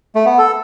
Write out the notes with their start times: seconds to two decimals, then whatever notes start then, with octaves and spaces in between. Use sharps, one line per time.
0.15 A3
0.26 B3
0.38 A4